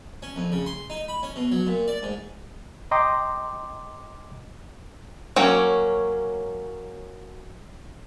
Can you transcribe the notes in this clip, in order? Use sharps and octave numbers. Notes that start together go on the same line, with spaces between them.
C#4
F2
C#3
C6
D#4
B5
C#4
B2
F#3
A#2
D5
G#2
D#5 G5 A#5 C6 D6
F#3 A#3 C#4